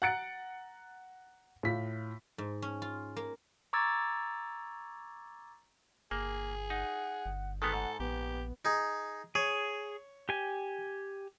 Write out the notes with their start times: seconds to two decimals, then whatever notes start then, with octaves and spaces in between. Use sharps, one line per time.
0.02 F#5 A#5 F#6 A6 C#7 D7
1.63 A2 F4 B6
2.38 G#2
2.62 C#4
2.82 F4
3.16 A#3
3.73 A#5 C#6 D6 E6 G#6 A6
6.11 G1 A#3 G#4
6.70 D#4 F#5
7.26 G1
7.62 D#3 G#3 B3 A4
7.73 G#2 F#5
8.00 A#1 B3 G4
8.65 D#4 G#4
9.35 G#4 C#5
10.29 G4 G#5